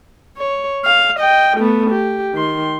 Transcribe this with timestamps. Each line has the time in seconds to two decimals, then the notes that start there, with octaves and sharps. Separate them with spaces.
0.37 C#5
0.85 F5
1.19 D#5 G5
1.57 A3 B3
1.91 G4
2.34 D#3 C6